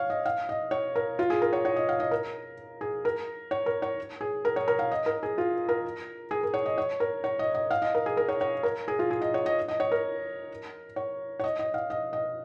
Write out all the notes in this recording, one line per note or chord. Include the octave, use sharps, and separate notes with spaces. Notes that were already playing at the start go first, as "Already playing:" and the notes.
Already playing: C#5 F5
D#5
F5
D#5
C#5
A#4
F4
G#4
A#4
C#5
C#5
D#5
F5
D#5
A#4
G#4
A#4
C#5
A#4
C#5
G#4
A#4
C#5
A#4
F5
D#5
A#4
G#4
F4
A#4
G#4
A#4
C#5
D#5
C#5
A#4
C#5
D#5
D#5
F5
D#5
A#4
G#4
A#4
C#5
C#5
A#4
G#4
F4
G#4
D#5
C#5
D#5
D#5
C#5
A#4
C#5
C#5
D#5
D#5
F5
D#5
D#5